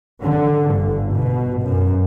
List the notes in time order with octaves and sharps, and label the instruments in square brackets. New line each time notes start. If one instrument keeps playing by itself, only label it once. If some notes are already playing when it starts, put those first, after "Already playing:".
[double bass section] D3
G1
B2
F#2